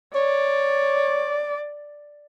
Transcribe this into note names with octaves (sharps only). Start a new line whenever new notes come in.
C#5 D5